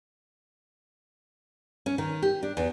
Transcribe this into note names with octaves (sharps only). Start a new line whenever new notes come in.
C#4
D#3
G4
D4
E2